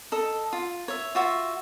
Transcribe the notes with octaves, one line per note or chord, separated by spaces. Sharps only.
A4 D#5
F4
C#5 E5
F4 F#4 E5